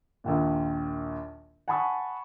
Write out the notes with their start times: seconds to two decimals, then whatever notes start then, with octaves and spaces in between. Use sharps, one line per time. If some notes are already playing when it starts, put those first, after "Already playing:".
0.24 A#1 D#2 A#2
1.68 F#5 G#5 A5 B5 C#6 D#6